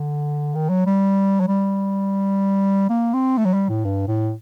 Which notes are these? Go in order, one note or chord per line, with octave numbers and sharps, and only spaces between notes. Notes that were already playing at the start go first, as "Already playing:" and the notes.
Already playing: D3
D#3
F#3
G3
F#3
G3
A#3
C4
A3
F#3
G3
A2
G2
A2